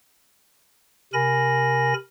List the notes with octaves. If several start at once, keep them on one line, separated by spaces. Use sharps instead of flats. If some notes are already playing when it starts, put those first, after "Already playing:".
C3 A#4 G#5 B5 A#6